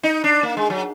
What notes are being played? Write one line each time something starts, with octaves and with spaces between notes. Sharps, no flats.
D#4
D4
A#3
G#3
F#3